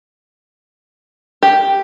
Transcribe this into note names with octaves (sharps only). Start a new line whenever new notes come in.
G4